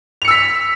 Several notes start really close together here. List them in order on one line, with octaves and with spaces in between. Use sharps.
F7 C#7 E6 B6